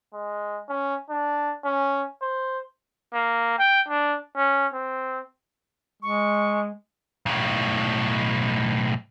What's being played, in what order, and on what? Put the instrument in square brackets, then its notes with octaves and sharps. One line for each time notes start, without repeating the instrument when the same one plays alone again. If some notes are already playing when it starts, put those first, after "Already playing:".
[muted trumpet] G#3
C#4
D4
C#4
C5
[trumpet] A#3
G5
D4
C#4
C4
[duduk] G#3 [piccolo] C#6
[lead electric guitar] B1 A2